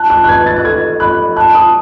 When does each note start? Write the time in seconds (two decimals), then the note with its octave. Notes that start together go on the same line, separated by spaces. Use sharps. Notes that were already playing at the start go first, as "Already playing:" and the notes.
Already playing: A5 F#6
0.10 F#6
0.24 F#6
0.28 B4 G#6
0.46 A6
0.56 F#6
0.64 A4 G#6
1.00 B5 F#6
1.36 A5 F#6
1.55 D#6